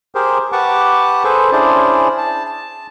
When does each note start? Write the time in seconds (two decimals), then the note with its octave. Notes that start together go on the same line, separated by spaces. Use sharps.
0.15 G4 G#4 A#4 C5
0.52 G4 B4 F#5 A5 C#6 D6
1.24 G#4 A4 B4 C5
1.52 C#4 D4 E4 G#4 C5 D5
2.18 A5
2.46 A5